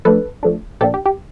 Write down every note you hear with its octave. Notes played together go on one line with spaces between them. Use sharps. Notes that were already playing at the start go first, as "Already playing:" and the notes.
F3 A3 D4 A4 B4
F3 A3 D4
A#2 F3 A#3 D4 G4 A4
G4
G4